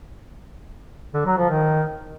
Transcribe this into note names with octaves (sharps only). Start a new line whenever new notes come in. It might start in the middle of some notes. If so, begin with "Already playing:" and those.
D3
F#3
F3
D#3